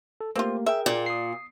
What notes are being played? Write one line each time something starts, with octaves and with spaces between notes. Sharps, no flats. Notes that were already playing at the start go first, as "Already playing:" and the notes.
A4
A3 A#3 C4 F4 G4
G#4 A#4 E5 G5
A#2 D5
D#6 C7